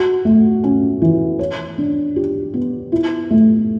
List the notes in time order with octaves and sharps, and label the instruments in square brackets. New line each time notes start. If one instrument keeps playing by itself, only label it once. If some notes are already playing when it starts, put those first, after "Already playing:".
Already playing: [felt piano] F#4
A3
C#4
E3
C#5
D4
G4
B3
E4
A3